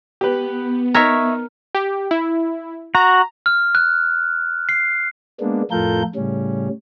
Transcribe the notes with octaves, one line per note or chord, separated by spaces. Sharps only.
B3 G4 B4
D#4 A#4 C#5 E5 C#6
G4
E4
F#4 A#5
F6
F#6
C7
G#3 A#3 B3 D4
F2 A2 F4 A4 A#4 G6
A2 C#3 G3 C#4